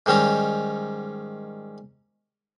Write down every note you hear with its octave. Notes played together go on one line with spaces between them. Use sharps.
G#2 D#3 G3 C#4 A#5